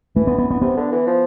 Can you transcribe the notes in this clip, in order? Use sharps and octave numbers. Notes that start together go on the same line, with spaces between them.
E3 A3
B3
B3
B3
C3 B3
D3
E3
F3